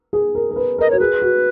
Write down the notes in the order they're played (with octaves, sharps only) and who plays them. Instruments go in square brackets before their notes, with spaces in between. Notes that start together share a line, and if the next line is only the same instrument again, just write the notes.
[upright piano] G#4
A#4
A#4
B4
[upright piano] A#4 [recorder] D#5
[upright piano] F#4 [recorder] C#5
[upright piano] G#4 [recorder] B4
[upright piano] F#4